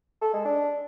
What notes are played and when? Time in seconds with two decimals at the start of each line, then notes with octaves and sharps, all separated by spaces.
0.22 A4
0.33 G#3
0.45 D4